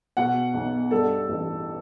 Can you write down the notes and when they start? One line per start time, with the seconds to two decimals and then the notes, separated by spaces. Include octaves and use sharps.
0.17 B2 F#5
0.54 B1
0.91 G2 A4
1.28 A1